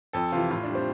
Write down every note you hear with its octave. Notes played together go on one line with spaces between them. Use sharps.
F2 A4
C3 E3 F4
A2 F4
D4
G3
C4